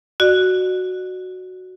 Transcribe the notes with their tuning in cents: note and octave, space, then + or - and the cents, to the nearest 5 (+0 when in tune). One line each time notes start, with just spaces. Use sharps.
F#4 +0 D5 +40